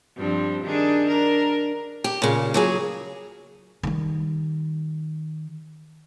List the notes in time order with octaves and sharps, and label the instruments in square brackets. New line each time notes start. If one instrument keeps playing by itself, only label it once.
[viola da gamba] G2 F3 C4
D#3 D4 G#4
D4 A#4
[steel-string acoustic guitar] G4
A#2 C#3
A#2 F#3 G#4
[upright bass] D#3 G3